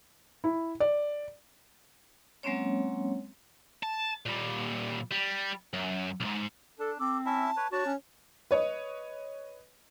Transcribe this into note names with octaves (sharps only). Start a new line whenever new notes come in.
E4
D5
F#3 G#3 A#3 C4 C#4 C#5
A5
A#2 G3
G3
F#2
B1 G#2
D4 A4
C4 A4 D6
C#4 E4 E5 A5
B4 C#5
D4 F#4 C#5 D5 A5
C#4
B4 C#5 D#5